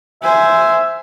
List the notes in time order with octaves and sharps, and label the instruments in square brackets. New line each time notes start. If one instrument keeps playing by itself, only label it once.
[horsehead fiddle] C5 G#5 [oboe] E5